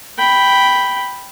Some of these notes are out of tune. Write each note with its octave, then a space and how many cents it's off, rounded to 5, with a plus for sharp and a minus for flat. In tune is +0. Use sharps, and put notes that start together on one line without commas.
G5 +0 B5 +0